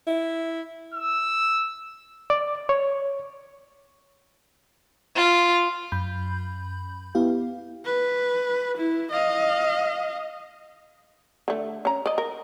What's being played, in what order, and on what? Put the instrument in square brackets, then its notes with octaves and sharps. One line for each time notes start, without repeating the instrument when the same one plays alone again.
[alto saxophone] E4
[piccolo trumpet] E6
[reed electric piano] D5
C#5
[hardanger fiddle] F4
[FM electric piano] F#2 B5 G6
B3 E4 G4 F5
[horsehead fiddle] B4
E4
D#5 F5
[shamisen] D3 A3
C#4 A#5
D5 D#5
A#4